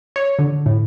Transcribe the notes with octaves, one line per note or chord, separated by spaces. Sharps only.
C#5
D3
A2